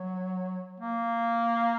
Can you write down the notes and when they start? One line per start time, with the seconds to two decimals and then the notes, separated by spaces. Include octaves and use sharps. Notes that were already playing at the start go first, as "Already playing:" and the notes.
Already playing: F#3
0.80 A#3